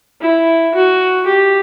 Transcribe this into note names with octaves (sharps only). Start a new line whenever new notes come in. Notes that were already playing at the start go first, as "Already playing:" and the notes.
E4
F#4
G4